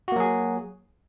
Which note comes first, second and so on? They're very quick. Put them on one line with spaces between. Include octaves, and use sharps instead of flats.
F#4 A#3 F#3 G#4